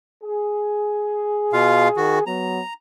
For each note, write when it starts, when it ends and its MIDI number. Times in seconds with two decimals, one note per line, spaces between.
0.24 2.25 68
1.53 1.88 47
1.53 1.88 65
1.53 1.88 77
1.97 2.19 51
1.97 2.19 66
2.27 2.60 54
2.27 2.60 59
2.27 2.73 82